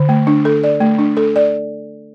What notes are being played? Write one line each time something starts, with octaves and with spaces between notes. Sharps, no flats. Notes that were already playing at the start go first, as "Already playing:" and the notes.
Already playing: D3
A3
D4
A4
D5
A3
D4
A4
D5